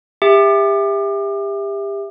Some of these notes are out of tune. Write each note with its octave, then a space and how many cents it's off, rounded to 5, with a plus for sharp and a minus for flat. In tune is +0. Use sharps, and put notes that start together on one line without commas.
G4 +30 E5 +0